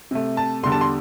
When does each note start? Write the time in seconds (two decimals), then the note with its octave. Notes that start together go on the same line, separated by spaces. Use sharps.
0.11 C3 A3
0.37 A5
0.63 E2 D3 G3 C6
0.72 A5
0.81 C6